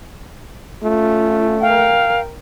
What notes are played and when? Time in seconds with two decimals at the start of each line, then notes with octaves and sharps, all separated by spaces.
0.83 A3 C#4 F4
1.62 A#4 F5 G5